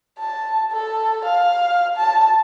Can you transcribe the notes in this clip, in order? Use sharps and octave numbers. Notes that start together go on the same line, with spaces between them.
A5
A4
F5
A5